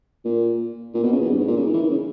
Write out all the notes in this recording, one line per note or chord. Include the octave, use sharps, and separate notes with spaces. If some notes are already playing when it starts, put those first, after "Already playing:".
A#2
A#2
B2
C#3
E2
G2
G#2
A#2
C#3
D#3
E3
D#3
C#3